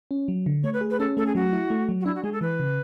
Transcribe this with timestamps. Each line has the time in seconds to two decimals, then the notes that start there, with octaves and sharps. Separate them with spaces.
0.11 C#4
0.28 F#3
0.46 D3
0.63 A3 C#5
0.73 B4
0.81 G#4
0.90 B4
0.99 C#4 A4
1.17 A3 A4
1.26 G#4
1.35 F#3 F#4
1.53 E4
1.70 A3
1.89 F#3
2.00 F#4
2.05 D4 E4
2.15 F#4
2.23 G#3 G#4
2.33 A4
2.41 E3 B4
2.60 C#3